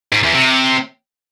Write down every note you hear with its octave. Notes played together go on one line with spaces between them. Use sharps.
G#2
E2
C3